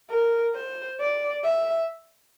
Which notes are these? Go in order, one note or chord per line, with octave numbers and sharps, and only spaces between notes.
A#4
C5
D5
E5